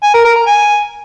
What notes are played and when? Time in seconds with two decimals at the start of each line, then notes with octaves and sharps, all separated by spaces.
0.03 G#5
0.14 A#4
0.25 A#4
0.35 A#5
0.46 G#5